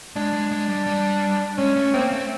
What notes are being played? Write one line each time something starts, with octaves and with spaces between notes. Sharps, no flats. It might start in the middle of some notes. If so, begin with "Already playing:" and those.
G#3 D4
G#3
G#3
G3
G3
G#3 C#4
A3
A#3 C4
A3